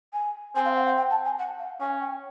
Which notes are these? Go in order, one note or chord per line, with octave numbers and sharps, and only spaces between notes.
G#5
C4 G#5
F5
F#5
F#5
G5
A5
G#5
F#5
F5
C#4 G#5
G5